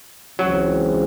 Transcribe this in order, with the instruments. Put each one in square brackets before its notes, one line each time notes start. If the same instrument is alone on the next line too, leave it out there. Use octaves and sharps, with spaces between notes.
[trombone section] C#2 C#3 E3 G#3 C4 [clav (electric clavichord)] F#3